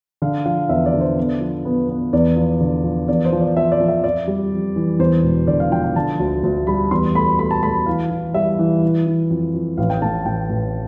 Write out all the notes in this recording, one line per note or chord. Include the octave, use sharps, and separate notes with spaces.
D3 F5
F3 F5
E2 E5
D5
D3
C5
B3
F3
B3
B3
E2 D5
F3
D3
F3
E2 D5
C5
F3
D5
F3 E5
D5
F3
E5
F2 D5
G3
F2
E3
E2 C5
E1
D3 D5
F5
F3 G5
G5
D3 A5
D2
D2
G3 B5
E2 C6
A3 B5
A3 B5
A5
A3 B5
E3 F5
E3
G3 E5
E3
E3
E3
F2
F2
A1 F5
G5
A2 A5
A1 G5
A1